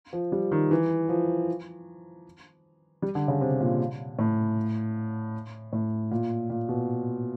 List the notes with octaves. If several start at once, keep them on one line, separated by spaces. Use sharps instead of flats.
F3
G3
D#3
E3
F3
G3
D3
C#3
C3
A#2
A2
A2
A#2
A#2
B2